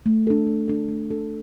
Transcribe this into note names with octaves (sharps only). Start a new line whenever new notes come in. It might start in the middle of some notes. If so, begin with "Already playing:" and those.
A3
D4 A4
A3
D4 A4
A3
D4 A4